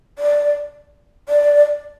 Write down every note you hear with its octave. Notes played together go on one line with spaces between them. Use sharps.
D5
D5